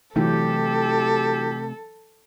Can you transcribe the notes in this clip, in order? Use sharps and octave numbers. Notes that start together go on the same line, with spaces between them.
C3 E3 F#3 A3 G4 A4